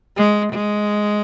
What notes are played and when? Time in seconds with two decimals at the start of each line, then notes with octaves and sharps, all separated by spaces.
0.17 G#3
0.53 G#3